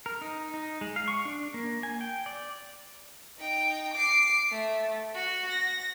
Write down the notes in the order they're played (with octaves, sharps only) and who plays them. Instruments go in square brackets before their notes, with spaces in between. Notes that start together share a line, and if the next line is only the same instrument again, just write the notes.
[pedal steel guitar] A#4
D#4
D#4
G#3
F5
C#6
D4
A#3
G#5
G5
D5
[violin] D#4 G5
D6 C7
A3
F#4
A#6